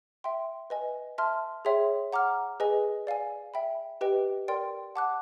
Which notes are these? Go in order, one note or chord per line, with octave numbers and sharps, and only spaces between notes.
E5 G5 C6
B4 D#5 G#5
E5 A5 C6 F6
G#4 C#5 E5 G5 C6
F#5 A#5 D6 F6
G#4 B4 D#5 G#5
D5 F5 G#5
E5 G5 B5
G4 B4 D#5 G5
A#4 D5 G5 C6
F#5 A5 D6 F#6